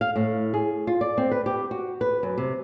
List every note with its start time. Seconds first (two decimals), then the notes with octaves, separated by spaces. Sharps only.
0.01 F5
0.16 A2
0.54 G#4
0.87 F4
1.01 D5
1.18 C4
1.31 B4
1.46 G4
1.71 F#4
2.01 B4
2.23 F#2
2.38 C3